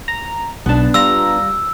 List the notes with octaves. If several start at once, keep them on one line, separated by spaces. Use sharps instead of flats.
A#5
B1 B3 D4 A5
G3 F4 A#5 E6